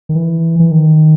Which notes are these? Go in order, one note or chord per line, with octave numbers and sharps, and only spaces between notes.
D#3
E3
E3
D#3